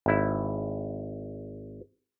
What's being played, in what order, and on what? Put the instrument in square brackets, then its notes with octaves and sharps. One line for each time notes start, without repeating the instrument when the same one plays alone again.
[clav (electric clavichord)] G#1 E4